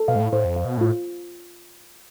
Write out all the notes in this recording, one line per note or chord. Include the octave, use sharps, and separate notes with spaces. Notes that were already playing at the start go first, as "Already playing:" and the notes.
Already playing: A4
B2 F5
G#2
A2
A2 C5
F2
F5
B2
A2 F4